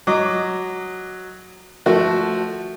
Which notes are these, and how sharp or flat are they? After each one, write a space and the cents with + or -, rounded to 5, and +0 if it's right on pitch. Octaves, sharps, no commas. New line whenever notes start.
F#3 +0 D#5 +0 D6 +0
F3 +0 A3 +0 F#4 +0